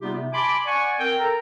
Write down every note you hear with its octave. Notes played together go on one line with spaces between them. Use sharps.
C3 G3 B3 D#4 F4 G4
C3
G#5 A5 B5 C6 D6
D5 F#5 G#5 C#6
C4 A#4 G5
A4 A#4 A#5